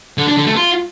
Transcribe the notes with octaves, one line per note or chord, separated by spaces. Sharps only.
D3
D4
D3
A3
F4